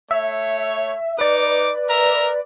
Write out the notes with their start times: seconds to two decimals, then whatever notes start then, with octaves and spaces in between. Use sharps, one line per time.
0.11 A3 C#5 E5
1.19 D#4 B4 D5 D6
1.89 A#4 E5 A#5